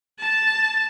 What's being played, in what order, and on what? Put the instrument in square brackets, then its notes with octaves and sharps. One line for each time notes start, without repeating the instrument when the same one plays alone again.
[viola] A5